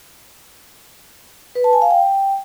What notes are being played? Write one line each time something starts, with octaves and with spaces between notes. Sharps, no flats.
B4
A5
G#5
F5
G5